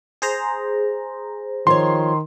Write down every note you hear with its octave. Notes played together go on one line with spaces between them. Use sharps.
G#4 C5 A#5
D#3 F3 C#5 C6